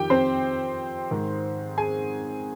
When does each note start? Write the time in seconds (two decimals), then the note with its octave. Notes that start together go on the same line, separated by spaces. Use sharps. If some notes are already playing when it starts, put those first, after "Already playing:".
Already playing: F2 D#3 G4 G5
0.10 C4 C5
1.11 G#2 D#3
1.78 G#4 G#5